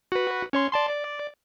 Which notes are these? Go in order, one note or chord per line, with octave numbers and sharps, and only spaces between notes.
F#4 B4
C#4 C#5 C6
D5 A5 C6
D5